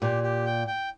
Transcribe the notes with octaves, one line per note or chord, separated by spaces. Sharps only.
A#2 G4
G4
G5
G5